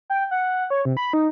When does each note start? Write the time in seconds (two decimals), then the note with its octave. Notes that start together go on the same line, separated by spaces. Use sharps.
0.10 G5
0.31 F#5
0.70 C#5
0.85 C3
0.97 B5
1.13 D#4